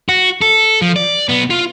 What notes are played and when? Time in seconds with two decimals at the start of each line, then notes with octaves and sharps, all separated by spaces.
0.09 F#4
0.41 A4
0.82 F3
0.96 D5
1.29 B1 B3
1.50 F4